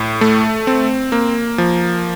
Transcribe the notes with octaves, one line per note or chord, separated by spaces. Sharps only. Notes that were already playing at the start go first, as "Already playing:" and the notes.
Already playing: A2
A3
C4
A#3
F3